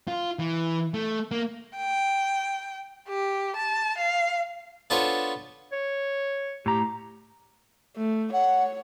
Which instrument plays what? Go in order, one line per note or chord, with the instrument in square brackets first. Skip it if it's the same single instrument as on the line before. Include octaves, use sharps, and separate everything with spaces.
[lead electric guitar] F4
E3
A3
A#3
[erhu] G5
G4
A5
F5
[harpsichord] B3 D4 F4 A4 C5 C#5
[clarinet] C#5
[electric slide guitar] A2 A#5 [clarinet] G4
[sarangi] A3
[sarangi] C#5 [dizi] F#5